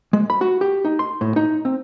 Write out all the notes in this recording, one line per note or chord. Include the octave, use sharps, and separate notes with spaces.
G#3
B5
F#4
G4
D#4
C6
A2
D#4
C4